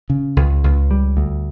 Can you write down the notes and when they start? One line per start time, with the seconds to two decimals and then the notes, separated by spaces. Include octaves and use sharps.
0.10 C#3
0.36 C#2
0.64 C#2
0.91 G3
1.17 D2